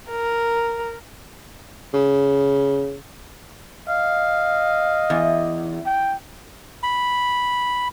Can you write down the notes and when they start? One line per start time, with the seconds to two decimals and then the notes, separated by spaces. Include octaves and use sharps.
0.10 A#4
1.93 C#3
3.88 D#5 F5
5.10 E2
5.86 G5
6.83 B5